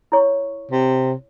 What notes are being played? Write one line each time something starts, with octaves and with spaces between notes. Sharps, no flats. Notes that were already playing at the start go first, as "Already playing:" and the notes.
E4 C#5 C#6
C3